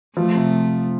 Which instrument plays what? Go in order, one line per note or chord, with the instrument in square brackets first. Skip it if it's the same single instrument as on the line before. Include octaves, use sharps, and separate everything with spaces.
[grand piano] F3 [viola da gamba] A3
[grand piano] C3